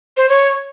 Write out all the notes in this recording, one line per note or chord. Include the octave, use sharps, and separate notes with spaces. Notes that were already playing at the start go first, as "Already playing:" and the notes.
C5
C#5